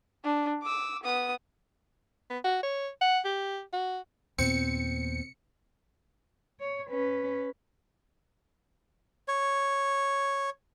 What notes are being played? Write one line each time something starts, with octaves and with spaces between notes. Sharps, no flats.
D4
D6 E6
B3 D#6
B3
F#4
C#5
F#5
G4
F#4
D#2 A#2 B3 C4 C#7
C#5
C#4 B4
C#5